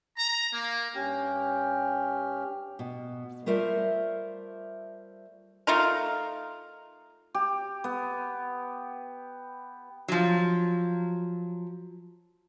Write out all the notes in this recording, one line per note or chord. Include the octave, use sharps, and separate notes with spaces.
A#5
A#3
G2 C#4 G4 G5 F6
B2
G3 A3 F4 A#4 C5 E5
A3 D#4 F4 A#4
G4
B3
F3 F#3